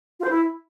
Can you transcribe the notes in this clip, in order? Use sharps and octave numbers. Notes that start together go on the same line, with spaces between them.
F4
C5
E4